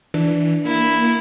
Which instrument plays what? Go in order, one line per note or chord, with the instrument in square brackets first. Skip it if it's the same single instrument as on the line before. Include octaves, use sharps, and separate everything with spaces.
[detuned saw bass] E3 [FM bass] D4
[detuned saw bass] A#3 [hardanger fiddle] E4